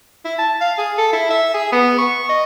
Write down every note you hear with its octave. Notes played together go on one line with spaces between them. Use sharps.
E4
A5
F5
G#4
A4
E4
E5
G#4
B3
C#6
D#5